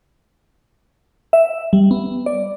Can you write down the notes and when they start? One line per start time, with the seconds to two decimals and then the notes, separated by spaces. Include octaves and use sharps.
1.33 E5
1.73 G3
1.91 B3
2.26 D5